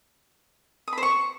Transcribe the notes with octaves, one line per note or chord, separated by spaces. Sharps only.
D#6
B5
C5
C#6